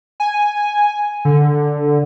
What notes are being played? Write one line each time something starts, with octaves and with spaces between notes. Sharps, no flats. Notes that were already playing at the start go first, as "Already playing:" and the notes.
G#5
D3